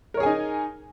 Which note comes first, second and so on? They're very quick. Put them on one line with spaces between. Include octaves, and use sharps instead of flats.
A#4 C#5 G#4 G#5 D#4